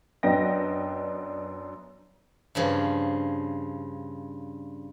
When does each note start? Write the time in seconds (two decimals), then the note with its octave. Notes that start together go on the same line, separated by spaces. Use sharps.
0.23 F#2 B3 D4 D#5 G5 A#6
2.55 G2 C#3 F3